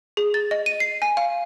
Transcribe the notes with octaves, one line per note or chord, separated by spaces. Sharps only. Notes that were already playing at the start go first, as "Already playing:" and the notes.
G#4
A6
D#5
D#7
C7
G#5
F5